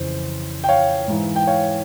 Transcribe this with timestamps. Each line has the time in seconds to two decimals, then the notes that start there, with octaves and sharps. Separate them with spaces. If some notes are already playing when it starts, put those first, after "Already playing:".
Already playing: F2 C#3 E3 C5
0.64 G5
0.69 C#5 F5
1.08 G#2 E3
1.36 G5
1.47 C#5 F5